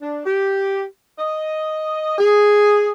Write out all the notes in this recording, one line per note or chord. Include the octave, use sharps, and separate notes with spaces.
D4
G4
D#5
G#4